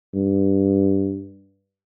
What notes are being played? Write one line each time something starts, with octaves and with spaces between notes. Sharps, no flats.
G2